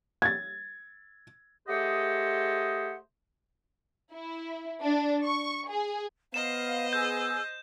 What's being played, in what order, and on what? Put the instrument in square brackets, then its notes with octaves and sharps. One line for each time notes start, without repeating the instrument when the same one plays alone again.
[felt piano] G#6 A6
[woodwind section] A3 G4 G#4 C5 D#5 F#5
[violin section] E4
D4
C#6
G#4
[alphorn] B3 [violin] C5 D#5 [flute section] F5 [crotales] E7
[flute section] G#4 E6 [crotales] G6